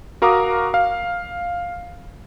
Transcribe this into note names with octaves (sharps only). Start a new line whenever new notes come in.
F#4 A#4 F5 A#5 D6 D#6
F5